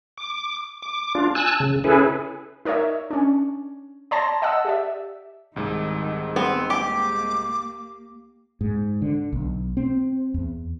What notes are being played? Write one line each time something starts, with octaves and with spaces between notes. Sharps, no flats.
D6
D6
D4 F4
G#5 A5 E6 F#6
C#3
C#4 E4 G#4 A4 B4
D#4 A#4 C#5 D5 E5
C#4 D4
C#5 D5 A5 A#5 C6 A#6
D#5 F#5 A5 E6
G4 D5 E5
C2 G#2 D#3
B3 C4
A#3 G4 D6
G#2
D3
B1
C4
E2